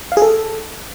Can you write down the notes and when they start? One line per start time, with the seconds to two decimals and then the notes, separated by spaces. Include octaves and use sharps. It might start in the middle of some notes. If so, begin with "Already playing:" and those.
0.12 F5
0.17 G#4
0.22 A4